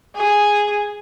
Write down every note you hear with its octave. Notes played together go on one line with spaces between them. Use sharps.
G#4